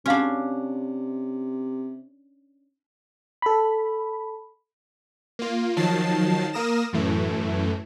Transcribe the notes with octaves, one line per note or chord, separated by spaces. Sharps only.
C3 C#4 D4 F#4 F5 F#5
A4 B5
A#3 F4
D#3 F3 F#3 A5 A6 C7
A#3 A#4 D#6 A#6 E7
F#2 A2 E3 A3